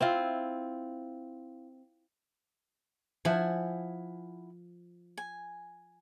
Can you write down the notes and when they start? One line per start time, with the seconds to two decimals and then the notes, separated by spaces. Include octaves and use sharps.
0.01 C4 E4 F4
3.25 F3 E4 F#5 G#5
5.18 G#5